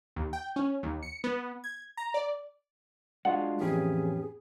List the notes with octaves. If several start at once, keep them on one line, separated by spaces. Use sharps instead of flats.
D#2
G5
C#4
D#2
C#7
B3
G#6
A#5
D5
G#3 D4 F4 F#4 F#5
F2 A2 E3 B3 C#4 G4 G#4